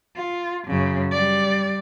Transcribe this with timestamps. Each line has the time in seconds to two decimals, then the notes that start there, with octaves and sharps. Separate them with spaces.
0.16 F4
0.67 F#2 C#3
1.12 G3 D5